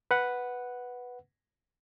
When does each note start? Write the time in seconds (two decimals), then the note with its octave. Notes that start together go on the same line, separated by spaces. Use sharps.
0.11 B4 F#5